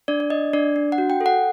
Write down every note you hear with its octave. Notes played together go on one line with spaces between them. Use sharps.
D4 D5
D5
D4 D#5
D4 D5
D4
F#5
F#4
G5
A4
F#5